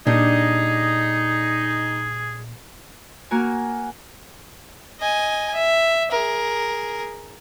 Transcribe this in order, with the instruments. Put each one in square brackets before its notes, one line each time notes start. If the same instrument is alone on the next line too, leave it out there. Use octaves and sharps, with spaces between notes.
[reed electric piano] A#2 [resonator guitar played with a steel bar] G3 D4 [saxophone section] D#4 [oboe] G#4
[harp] A#3 F#4 A#4 G#5
[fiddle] D#5 G#5
E5
G#4 A#4